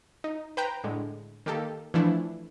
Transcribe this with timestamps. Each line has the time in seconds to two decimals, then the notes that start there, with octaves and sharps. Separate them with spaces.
0.24 D#4
0.57 B4 C5 G5 A#5
0.84 A2 D3 G#3
1.46 D#3 A#3 G4 A4
1.94 E3 F3 A3 D4 E4